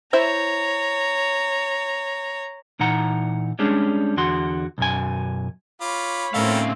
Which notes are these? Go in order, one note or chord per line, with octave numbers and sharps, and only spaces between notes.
E4 C5 C#5 E5 A#5
A#2 E3 D#4 F#5 A#5
G3 G#3 C#4 D4 G#4
E2 D3 F#4 C6
B1 F#2 G#5
F4 C#5 B5 D6
A2 C4 C#4 A4 A#4 E5 F5